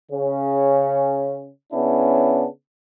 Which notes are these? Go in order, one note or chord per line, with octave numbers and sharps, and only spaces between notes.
C#3 C#4
C#3 B3 C#4 D4 E4